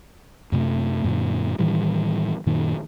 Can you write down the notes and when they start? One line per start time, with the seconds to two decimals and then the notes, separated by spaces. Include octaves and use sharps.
0.52 F#2 C3 A3
1.04 F#2 A#2 D3
1.59 A2 D#3 E3 G3
2.46 F#2 A#2 D#3